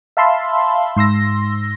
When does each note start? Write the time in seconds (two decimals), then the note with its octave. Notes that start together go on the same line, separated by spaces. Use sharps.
0.17 E5 F5 A5 B5 C6 E6
0.96 G#2 C6 E6 A#6